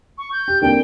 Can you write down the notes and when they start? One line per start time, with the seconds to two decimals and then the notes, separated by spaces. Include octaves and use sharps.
0.18 C#6
0.32 G6
0.48 G4
0.62 D3 A#3 C4 G5